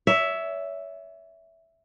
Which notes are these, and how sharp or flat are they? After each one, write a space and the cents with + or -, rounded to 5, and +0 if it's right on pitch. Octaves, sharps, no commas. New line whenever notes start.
C#5 +35 E5 +0